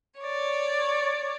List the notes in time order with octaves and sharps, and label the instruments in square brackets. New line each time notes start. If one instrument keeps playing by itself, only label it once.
[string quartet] C#5 D5